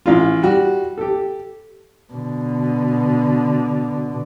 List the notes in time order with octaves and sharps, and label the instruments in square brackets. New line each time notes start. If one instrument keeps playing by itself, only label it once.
[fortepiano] A1 F4
G3 F#4
G4 A4
[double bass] B2 D3